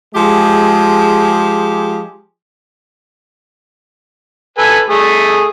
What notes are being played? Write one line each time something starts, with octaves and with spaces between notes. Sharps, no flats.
F3 G#3 G4 G#4
A4 B4 G#5
A3 G#4